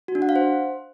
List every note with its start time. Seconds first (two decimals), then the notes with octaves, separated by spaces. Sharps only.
0.08 F#4
0.15 D4
0.22 F#5
0.29 F5
0.36 C5